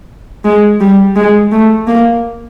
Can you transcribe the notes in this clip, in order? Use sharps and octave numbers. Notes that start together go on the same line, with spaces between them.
G#3
G3
G#3
A3
A#3